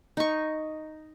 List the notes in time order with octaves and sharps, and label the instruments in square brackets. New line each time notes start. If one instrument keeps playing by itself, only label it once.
[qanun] D#4 C#6